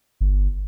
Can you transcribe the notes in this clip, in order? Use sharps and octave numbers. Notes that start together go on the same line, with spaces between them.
G1